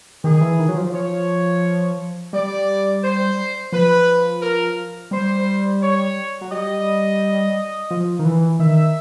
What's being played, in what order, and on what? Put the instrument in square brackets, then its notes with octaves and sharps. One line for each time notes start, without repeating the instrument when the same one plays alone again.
[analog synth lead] D#3 [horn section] G#4
[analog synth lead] E3
D#3
F#3
F3
[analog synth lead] F3 [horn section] C#5
[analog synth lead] G3 [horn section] D5
[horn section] C5
[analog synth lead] F3 [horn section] B4
[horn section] A#4
[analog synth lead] G3 [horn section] C5
[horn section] C#5
[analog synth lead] F#3
[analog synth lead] G3 [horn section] D#5
[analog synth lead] F3
D#3
E3
[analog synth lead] D#3 [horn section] E5